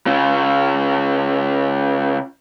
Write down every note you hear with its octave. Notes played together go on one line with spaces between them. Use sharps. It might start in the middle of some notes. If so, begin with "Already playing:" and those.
C#3 F4